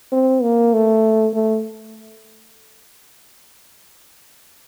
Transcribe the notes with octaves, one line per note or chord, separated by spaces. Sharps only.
C4
A#3
A3
A3